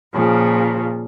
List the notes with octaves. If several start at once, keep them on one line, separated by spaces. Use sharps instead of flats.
A#2 C#3 F3